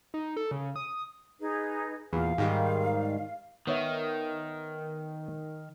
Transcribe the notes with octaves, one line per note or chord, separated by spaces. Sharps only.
D#4
A4
C#3
D#6
D#4 G#4 B4
E2 A#2 F5
G#2 D#3 G3
D#3 B3 C#5 E5